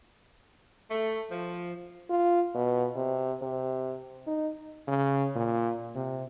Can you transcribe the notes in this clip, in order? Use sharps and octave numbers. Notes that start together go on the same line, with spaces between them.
A3
F3
F4
B2
C3
C3
D#4
C#3
A#2
C3